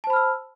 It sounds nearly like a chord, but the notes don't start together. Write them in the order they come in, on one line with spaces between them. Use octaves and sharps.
A5 C5 B5 F6 E6